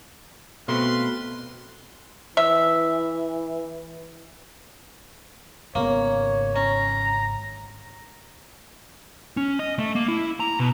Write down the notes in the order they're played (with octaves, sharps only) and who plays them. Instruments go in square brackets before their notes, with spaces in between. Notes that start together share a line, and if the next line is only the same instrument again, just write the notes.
[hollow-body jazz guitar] B2 A3 C4 [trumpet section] B4 F5 C6
[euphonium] E3 [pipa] E5
[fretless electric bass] G#1 C#3 B3 [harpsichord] A#3 [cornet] C#5
[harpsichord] C#4 [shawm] A#5
[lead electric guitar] C#4
D#5
A3
A#3
E4
A#5
B2